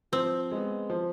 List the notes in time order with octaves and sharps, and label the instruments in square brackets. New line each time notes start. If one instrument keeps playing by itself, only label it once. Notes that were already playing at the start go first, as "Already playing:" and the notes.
[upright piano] F3 [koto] C4
[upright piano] G#3 B3
F3